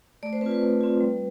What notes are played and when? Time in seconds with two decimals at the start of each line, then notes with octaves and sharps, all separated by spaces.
0.23 A3 D5
0.33 C5
0.41 C4 F4 B4
0.51 B4
0.61 A3
0.81 C4 F4
1.00 G3